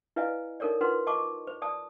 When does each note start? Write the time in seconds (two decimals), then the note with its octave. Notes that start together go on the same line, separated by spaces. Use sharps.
0.16 E4 B4 D5 D#5 F5 G#5
0.60 D#4 A4 A#4 C#5 D5
0.81 D#4 F4 A#4 B4 F#5 C6
1.07 D#5 A5 C#6 D6
1.47 C5
1.62 D5 A5 D#6